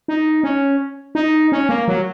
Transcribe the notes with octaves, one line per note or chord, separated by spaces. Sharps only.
D#4
C#4
D#4
C#4
A#3
F#3